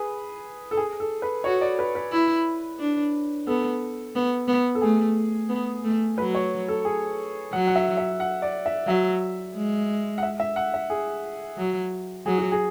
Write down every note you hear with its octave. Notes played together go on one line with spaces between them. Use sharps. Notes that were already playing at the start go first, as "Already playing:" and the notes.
Already playing: G#4 B4
A4
G#4
A4
B4
F#4 C#5
D5
B4
B4
E4
D4
B3 A4
B3
B3
A4
A3 G#4
B3
A3
F#3 B4
C#5
A4
G#4
F#3 F#5
F#5
E5
E5
F#5
D5
E5
F#3 E5
G#3
F#5
E5
E5
F#5
E5
G#4
F#3
F#3 G#4
F#4
G#4